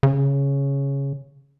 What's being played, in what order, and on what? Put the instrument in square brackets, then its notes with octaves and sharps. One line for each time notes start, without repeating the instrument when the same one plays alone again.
[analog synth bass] C#3